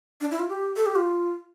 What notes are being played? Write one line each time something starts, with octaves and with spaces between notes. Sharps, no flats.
D4
E4
F4
G4
A4
G4
F4